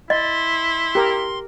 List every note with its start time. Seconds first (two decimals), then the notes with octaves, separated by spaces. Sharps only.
0.10 E4 D#5 C6
0.95 G4 A#4